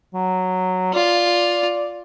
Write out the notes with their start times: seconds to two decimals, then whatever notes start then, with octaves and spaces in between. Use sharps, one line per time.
0.14 F#3
0.94 F4 D5